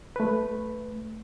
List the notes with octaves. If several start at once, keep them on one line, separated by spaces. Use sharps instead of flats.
A3 B4